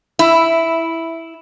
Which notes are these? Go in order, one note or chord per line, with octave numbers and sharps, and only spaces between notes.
E4